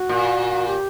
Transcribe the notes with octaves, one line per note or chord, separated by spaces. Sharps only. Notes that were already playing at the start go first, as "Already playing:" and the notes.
Already playing: F#4
A#2
G4